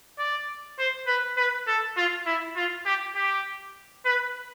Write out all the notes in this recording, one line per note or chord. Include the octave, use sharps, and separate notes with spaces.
D5
C5
B4
B4
A4
F4
E4
F4
G4
G4
B4